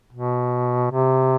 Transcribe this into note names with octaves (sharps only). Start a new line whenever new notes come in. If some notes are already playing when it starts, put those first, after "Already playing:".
B2
C3